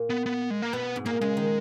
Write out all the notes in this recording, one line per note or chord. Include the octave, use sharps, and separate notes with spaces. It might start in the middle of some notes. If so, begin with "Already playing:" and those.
Already playing: A#2
B3
B3
G#3
A#3
B2 B3
G#2
A#2 A#3
C#3 G#3
D#3